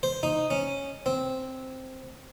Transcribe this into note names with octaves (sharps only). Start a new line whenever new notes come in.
C5
D#4
C#4
C4